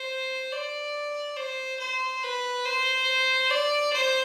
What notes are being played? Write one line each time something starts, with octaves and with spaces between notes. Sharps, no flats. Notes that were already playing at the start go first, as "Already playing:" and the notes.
Already playing: C5
D5
C5
C5
B4
C5
D5
C5